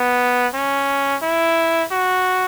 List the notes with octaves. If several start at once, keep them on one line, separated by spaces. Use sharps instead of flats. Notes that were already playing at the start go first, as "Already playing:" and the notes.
Already playing: B3
C#4
E4
F#4